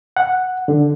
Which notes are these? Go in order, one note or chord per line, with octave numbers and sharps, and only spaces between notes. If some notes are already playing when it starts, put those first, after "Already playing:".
F#5
D3